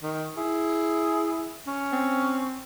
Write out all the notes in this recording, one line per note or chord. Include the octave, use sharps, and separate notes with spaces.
D#3
E4 G#4
C#4
C4